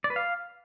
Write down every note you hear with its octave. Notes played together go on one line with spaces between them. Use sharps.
D5
B4
F5